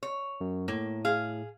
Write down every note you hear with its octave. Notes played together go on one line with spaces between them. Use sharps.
C#5
F#2
A2 A#3
G#4 F5